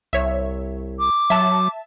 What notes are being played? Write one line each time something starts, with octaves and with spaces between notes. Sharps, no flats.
C2 C#5 E5
D6
F#3 E5 A5